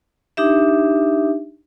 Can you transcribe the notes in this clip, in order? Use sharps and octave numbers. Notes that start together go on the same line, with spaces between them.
D4 D#4 G4 E5